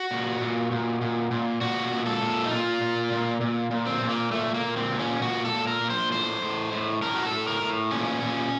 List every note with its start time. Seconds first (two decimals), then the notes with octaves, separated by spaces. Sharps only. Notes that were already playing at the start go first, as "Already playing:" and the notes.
Already playing: F#4
0.11 A#2
0.41 A#2
0.72 A#2
1.02 A#2
1.31 A#2
1.61 A#2 F#4
1.91 A#2
2.06 A4
2.22 A#2
2.46 D#4
2.51 A#2 F4
2.81 A#2
3.12 A#2
3.41 A#2
3.71 A#2
3.86 C4
4.02 A#2
4.09 A#3
4.31 A#2 A3
4.54 A#3
4.62 A#2
4.77 C4
4.92 A#2
4.99 C#4
5.22 A#2 F#4
5.45 A4
5.52 A#2
5.67 A#4
5.81 A#2
5.90 C5
6.12 A2 C5
6.42 A2
6.72 A2
7.02 A2 A#4
7.15 F#4
7.25 A4
7.32 A2
7.48 A#4
7.62 A2
7.92 A#2 C#4
8.22 A#2